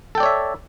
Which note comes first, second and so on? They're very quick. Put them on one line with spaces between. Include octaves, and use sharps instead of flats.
A4 G5 D5 C#5 E5